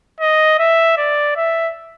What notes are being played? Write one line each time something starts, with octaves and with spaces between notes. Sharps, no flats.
D#5
E5
D5
E5